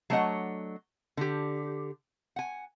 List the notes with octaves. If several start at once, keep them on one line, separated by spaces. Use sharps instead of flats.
F#3 A3 D4 C#5 D#5 F#5
D3 G4
F#5 G#5